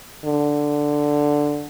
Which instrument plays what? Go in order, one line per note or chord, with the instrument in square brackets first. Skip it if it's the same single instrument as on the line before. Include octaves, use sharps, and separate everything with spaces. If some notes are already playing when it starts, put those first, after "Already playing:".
[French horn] D3